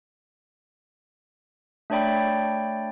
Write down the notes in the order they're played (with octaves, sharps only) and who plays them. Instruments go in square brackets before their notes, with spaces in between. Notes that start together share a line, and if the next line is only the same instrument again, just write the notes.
[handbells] A3 D4 C#5 D5 G5 B5